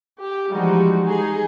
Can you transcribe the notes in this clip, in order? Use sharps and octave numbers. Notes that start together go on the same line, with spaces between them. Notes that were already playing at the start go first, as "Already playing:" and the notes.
G4
E3 F3 G3 G#3 D#4 F#4
D#4 G#4